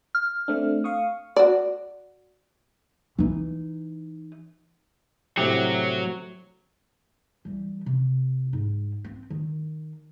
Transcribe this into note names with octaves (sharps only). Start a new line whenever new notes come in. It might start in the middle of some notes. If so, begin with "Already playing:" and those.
F6
A3 C4 D4
F5 C#6 D#6
F#4 D5
E3 D#4
A2 C3 F#3 F#4 G4
E3 G3
C3
G#2
C4
D#3